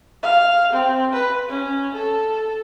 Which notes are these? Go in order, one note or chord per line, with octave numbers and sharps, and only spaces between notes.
F5
C4
B4
C#4
A4